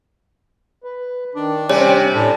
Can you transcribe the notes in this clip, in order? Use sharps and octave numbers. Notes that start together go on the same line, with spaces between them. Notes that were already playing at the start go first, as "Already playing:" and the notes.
B4
D#3 D4
C3 G3 C4 C#4 C#5
A2 D4 A4